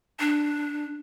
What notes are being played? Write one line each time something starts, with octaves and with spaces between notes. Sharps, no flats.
D4